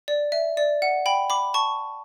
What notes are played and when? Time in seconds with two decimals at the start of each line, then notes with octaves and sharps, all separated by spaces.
0.08 D5
0.32 E5
0.57 D5
0.82 F#5
1.06 G5 B5
1.30 B5 D6
1.54 A5 C#6